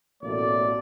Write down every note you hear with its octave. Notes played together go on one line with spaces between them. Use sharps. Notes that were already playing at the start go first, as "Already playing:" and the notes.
A1 B2 A3 A#3 D5